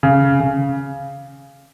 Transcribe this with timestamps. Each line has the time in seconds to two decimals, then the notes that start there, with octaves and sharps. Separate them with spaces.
0.03 C#3
0.40 C#3